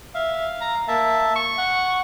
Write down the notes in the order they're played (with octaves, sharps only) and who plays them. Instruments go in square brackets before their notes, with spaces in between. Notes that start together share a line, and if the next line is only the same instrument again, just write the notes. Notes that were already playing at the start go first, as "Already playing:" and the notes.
[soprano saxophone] E5 [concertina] F5
[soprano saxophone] A#5
[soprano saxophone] A#3 [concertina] E5 A5
[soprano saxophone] C#6
[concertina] F#5